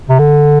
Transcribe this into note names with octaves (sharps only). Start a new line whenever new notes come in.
C3
D3